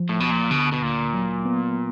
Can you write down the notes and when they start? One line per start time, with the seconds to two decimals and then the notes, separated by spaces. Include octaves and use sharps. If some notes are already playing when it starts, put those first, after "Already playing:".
Already playing: F3
0.09 A2
0.19 D2 B2
0.31 A#2
0.51 B2 D3
0.72 B2
0.82 D2 A#2
1.13 F#3
1.45 B3